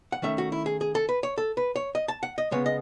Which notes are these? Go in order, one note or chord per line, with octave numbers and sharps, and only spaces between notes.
F#5
D#3 A3 C#4 E5
F#4
E4
G#4
G#4
A4
B4
C#5
A4
B4
C#5
D#5
A5
F#5
D#5
C#3 G#3 B3 C#5
D#5